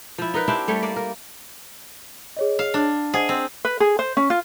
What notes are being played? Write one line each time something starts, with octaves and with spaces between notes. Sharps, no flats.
F3 E4
D#4 A#4 B4
C4 D4 E4 G4
G3 A3 C#5
A#3 D5
A#4
G#4 C#5 D#5
F5
D4
G#4 C5 D#5 F#5
C4
B4
G#4
C5
C#4
F4